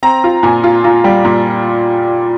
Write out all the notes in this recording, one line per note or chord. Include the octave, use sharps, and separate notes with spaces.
C4 A#5
F4
A#2 G#5
F4
F4 A#5
G3
A#2